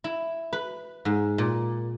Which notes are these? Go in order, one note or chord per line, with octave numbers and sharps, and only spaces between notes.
E4
B4
G#2
A#2